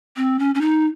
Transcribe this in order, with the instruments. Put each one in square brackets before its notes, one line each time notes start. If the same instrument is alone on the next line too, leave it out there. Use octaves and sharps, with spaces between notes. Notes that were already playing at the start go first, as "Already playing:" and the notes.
[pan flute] C4
C#4
C#4
D#4